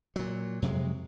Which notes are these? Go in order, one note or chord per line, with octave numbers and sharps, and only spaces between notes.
A#2 F#3
F2 C3 F#3 G#3